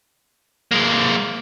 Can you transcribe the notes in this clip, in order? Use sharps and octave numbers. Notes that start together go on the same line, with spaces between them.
G#3 A#3